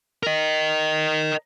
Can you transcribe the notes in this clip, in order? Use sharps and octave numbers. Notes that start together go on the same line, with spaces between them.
A#4 D#5